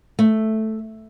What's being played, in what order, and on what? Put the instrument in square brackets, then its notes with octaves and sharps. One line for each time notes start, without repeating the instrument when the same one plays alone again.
[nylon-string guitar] A3